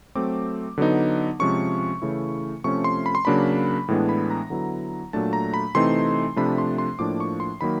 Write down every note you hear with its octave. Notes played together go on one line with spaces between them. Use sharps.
F#3 A3 C4 D6
D3 F#3 B3 D#4
C3 F3 G#3 C#4 C#6
C#3 E3 A3 C#4 E4
C3 F3 A3 C#4 C#6
C6
B5
C6
C#3 F#3 A#3 D4 B5
A2 E3 G#3 B3 D4
B5
A#5
D3 F#3 B3 E4
A#2 F#3 A3 D4 A5
A#5
B5
C3 E3 A3 C4 D#4 C6
C3 F3 A3 D4 B5
C6
C6
A2 F3 A#3 D4 D6
C#6
C6
D#3 F#3 A#3 B5